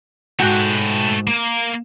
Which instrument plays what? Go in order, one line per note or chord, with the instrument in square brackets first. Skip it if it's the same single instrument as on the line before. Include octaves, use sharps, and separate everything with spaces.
[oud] G#2 F#4 [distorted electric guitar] A3 G5
[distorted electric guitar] A#3